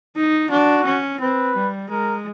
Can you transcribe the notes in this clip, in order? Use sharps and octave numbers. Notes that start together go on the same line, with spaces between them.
D#4
D4 F#4
C#4
C4 B4
G3
G#3 A#4